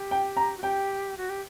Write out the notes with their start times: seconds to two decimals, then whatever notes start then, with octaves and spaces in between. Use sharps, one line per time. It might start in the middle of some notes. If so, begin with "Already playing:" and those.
Already playing: G4
0.11 G5
0.37 A#5
0.57 F#4
0.63 G4 G5
1.17 F#4
1.29 G4